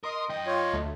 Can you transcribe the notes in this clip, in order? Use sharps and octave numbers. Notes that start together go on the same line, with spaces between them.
A#4 D#5 C6 D#6
F#2 D#5 G5
F4 C#5
D2 A3